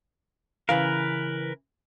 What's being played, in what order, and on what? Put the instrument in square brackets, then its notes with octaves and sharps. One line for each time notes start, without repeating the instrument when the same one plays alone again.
[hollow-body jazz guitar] C#3 E3 F5 [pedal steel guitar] A#4 B4